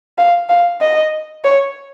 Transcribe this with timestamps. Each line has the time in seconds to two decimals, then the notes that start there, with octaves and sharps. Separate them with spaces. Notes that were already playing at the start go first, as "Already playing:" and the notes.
0.18 F5
0.49 F5
0.81 D#5
1.44 C#5